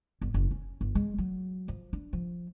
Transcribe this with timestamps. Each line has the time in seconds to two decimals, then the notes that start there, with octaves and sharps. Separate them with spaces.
0.21 G1
0.34 F#1
0.51 C#4
0.81 G1
0.95 G#3
1.18 F#3
1.68 F3
1.93 D4
2.13 F3